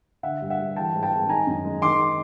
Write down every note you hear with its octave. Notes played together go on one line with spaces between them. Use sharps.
D3 E5 F#5
G2
E5 F#5
G3
E3 G5 A5
G#2
G5 A5
G#3
D#3 G#5 A#5
F#2
G#3
D#3 C6 D6